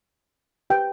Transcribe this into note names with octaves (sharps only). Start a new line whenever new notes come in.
G4 B4 G5